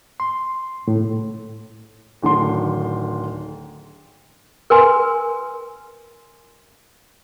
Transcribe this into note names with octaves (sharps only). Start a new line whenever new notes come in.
C6
A2
D1 D3 D#3 C6
A#4 B4 G#5 C6